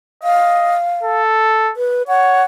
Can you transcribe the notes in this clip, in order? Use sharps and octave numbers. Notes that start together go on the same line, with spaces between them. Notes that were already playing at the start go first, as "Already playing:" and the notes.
D#5 F5
A4
B4
C#5 F#5